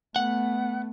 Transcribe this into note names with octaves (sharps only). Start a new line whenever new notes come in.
A3 B3 F#5